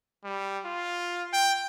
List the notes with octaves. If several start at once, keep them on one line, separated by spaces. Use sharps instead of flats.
G3
F4
G5